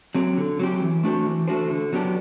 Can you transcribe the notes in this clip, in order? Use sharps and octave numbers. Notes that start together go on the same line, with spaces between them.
F#3 C4 G4
D3
F#3 C4 G4
E3
A3 D4 F#4 C5
E3
A3 D4 F#4 C5
D3
F#3 B3 D4 G4